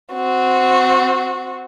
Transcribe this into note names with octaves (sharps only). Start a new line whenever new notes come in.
C4 F#4